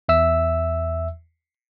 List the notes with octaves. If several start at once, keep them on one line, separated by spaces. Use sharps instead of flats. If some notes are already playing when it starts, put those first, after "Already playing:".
E2 E5 E6